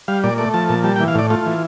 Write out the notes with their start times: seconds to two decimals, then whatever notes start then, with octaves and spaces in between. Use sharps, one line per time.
0.08 G3 F5
0.24 A#2 D5
0.38 A3 D5
0.54 F3 A5
0.69 A#2 A5
0.84 G3 A5
0.96 G5
1.00 E3
1.08 F5
1.15 A2 D5
1.30 A3 F4
1.46 E3